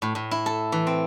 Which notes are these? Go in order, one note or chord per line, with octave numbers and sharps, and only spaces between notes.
A2
A2
E4
A4
E3
C4